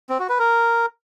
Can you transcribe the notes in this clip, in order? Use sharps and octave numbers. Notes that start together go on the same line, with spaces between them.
C4
F#4
B4
A#4